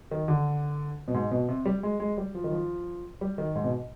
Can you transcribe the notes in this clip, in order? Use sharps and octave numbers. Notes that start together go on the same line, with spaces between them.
D#3
D3
B2
G#2
B2
C3
G3
G#3
G#3
G3
F3
D#3
F3
G3
D#3
G#2
B2